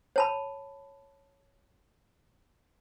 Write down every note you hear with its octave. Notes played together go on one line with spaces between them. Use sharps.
C#5 A5 B5